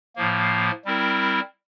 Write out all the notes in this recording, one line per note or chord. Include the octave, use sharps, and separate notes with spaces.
A2 F3 A#3
G3 C4 E4 A#4